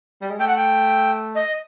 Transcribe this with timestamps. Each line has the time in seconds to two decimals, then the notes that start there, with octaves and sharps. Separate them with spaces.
0.22 G3
0.30 G#3
0.39 A3 G5
0.47 F#5
0.56 G5
1.35 D#5